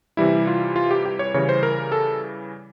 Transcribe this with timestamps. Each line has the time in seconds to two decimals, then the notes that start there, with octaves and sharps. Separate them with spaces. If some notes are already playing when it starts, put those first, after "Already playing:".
0.17 C3 E3 G3 E4
0.47 F4
0.76 F4
0.91 G4
1.05 G4
1.19 C#5
1.34 C#3 E3 G3 C#5
1.49 C5
1.63 A#4
1.92 A4